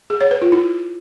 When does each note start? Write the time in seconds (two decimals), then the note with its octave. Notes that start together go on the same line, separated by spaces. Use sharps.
0.10 G#4
0.21 C#5
0.31 B4
0.42 F4
0.52 E4